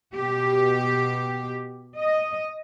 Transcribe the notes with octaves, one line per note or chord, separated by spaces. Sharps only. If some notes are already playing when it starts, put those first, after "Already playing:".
B2 G4
D#5